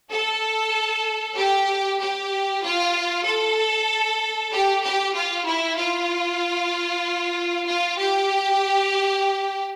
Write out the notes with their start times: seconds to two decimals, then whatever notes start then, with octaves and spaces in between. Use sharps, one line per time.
0.10 A4
1.36 G4
1.99 G4
2.63 F4
3.26 A4
4.52 G4
4.83 G4
5.15 F4
5.46 E4
5.78 F4
7.67 F4
7.98 G4